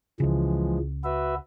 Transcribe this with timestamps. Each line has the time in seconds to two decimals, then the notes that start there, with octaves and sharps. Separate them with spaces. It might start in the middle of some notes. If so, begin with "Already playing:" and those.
0.20 C#2 C#3 E3 F3 G#3
1.04 F#4 B4 E5